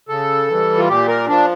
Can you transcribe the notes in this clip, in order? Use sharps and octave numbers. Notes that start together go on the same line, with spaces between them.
C#3 A4
E3 G3
F4
A#2 G4
A#4
F3 D4